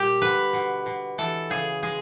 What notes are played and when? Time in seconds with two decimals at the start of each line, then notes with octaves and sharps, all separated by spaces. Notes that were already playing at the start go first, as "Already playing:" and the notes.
Already playing: A#2 G3 G4
0.22 D3 B4
0.53 B2
0.86 B2
1.18 E3 A4
1.50 C#3 G#4
1.83 G#3 G#4